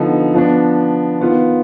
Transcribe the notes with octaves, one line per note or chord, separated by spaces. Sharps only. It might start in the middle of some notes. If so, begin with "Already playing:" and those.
Already playing: D3 F3 B3 D#4
F3 B3 D4
D#3 B3 F4